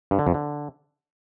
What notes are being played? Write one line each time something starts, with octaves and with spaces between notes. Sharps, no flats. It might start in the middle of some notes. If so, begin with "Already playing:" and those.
G2
D3
F2
D3